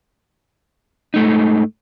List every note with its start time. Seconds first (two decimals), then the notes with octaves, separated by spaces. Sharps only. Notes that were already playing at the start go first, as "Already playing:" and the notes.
1.14 G#2 A3 D#4